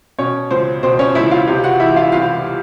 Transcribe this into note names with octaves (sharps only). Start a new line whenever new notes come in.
B2 C#4 C#5
C#2 C4 C5
B2 C4 C5
C#4 C#5
C#2 E4 E5
F4 F5
C3 F4 F5
F#4 F#5
E3 E4 E5
F4 F5
C2 F4 F5